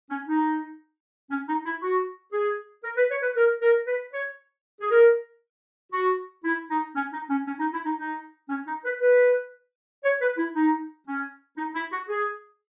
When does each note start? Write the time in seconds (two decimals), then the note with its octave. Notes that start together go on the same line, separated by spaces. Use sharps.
0.10 C#4
0.27 D#4
1.30 C#4
1.48 D#4
1.65 E4
1.82 F#4
2.33 G#4
2.84 A#4
2.97 B4
3.11 C#5
3.22 B4
3.37 A#4
3.62 A#4
3.87 B4
4.14 C#5
4.81 G#4
4.91 A#4
5.92 F#4
6.44 E4
6.70 D#4
6.95 C#4
7.13 D#4
7.30 C#4
7.47 C#4
7.60 D#4
7.73 E4
7.85 D#4
7.98 D#4
8.49 C#4
8.66 D#4
8.84 B4
9.01 B4
10.04 C#5
10.21 B4
10.38 E4
10.55 D#4
11.06 C#4
11.57 D#4
11.75 E4
11.92 F#4
12.09 G#4